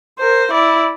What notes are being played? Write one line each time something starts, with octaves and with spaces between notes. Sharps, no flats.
A#4 C5
E4 D5